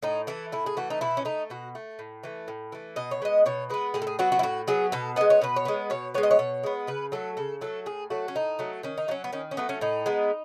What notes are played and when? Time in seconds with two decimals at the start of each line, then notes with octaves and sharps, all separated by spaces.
0.03 A2 D#4
0.27 E3 A3 E4
0.52 A2 E4
0.66 G#4
0.77 E3 A3 F#4
0.90 D#4
1.01 B2 E4
1.17 C#4
1.25 A3 D#4
1.50 B2 F#4
1.75 A3
1.99 A2
2.24 E3 A3
2.48 A2
2.72 E3 A3
2.96 B2 D#5
3.11 C#5
3.22 G#3 B3 D#5
3.46 B2 C#5
3.70 G#3 B3 B4
3.94 A2 G#4
4.02 A4
4.07 G#4
4.19 F#3 B3 F#4
4.32 F#4
4.39 E4
4.43 A2 F#4
4.68 F#3 B3 G#4
4.92 B2 A4
5.16 G#3 B3 D#5
5.30 C#5
5.42 B2 B4
5.56 C#5
5.65 G#3 B3
5.90 B2 C#5
6.14 G#3 B3 C#5
6.23 D#5
6.31 C#5
6.39 B2
6.63 G#3 B3
6.87 C#3 B4
7.12 F#3 A3 A4
7.37 C#3 A4
7.61 F#3 A3 A4
7.86 A2 G#4
8.10 F#3 A3 F#4
8.28 C#4
8.35 A2 D#4
8.59 F#3 A3
8.83 D#3 C#4
8.98 D#4
9.08 F#3 A3
9.11 C#4
9.24 B3
9.32 D#3 C#4
9.51 C#4
9.57 F#3 A3 B3
9.69 C#4
9.81 A2 D#4
10.06 G#3 B3